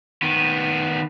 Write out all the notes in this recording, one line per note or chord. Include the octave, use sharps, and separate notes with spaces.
D#3 B3